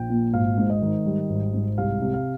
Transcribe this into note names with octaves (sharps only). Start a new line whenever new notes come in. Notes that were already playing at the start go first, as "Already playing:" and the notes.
Already playing: A#1 G5
A#2
G#1 F5
G#2
D#5
D#3
G3
G#1
G#2
C2 F5
C3
F5